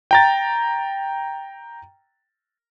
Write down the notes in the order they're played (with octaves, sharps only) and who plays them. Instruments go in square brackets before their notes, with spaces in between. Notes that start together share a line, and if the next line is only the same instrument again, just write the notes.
[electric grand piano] G5 A#5 A6